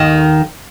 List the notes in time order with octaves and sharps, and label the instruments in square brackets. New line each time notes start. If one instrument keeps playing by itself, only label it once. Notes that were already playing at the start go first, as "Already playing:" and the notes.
Already playing: [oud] D#2 D#3